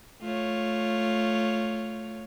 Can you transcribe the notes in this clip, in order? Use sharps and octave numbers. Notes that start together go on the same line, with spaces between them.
A3 F4 C#5